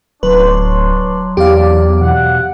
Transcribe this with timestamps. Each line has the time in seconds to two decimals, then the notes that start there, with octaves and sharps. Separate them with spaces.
0.23 D1 F#3 D4 B4 C#5 C6
1.37 E2 G4 D5 F5
2.01 B2 F#5